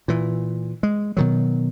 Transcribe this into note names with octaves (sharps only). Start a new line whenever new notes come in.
A#2 E3
G#3
B2 D#3 F#3